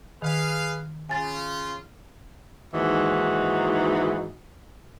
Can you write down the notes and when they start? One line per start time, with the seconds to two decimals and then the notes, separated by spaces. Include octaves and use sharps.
0.22 D#3 G#4 B4 F5
1.09 C#3 F4 G#5 A6
2.73 D#2 G#2 E3 D#4 F#4